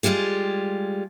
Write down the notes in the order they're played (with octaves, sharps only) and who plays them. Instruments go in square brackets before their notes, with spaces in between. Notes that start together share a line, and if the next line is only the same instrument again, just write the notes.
[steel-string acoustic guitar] G3 G#3 F4 G4 G#4